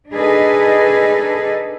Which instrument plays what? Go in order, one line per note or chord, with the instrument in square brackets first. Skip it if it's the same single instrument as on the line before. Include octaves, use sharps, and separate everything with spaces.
[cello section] D4 D#4 G#4 A4 B4 D#5